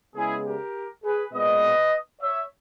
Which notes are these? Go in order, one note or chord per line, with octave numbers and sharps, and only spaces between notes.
C#3 G#3 B3 E4 G#4
G4 A#4
G#4 B4
A#2 G#3 B3 B4 D#5
C#5 E5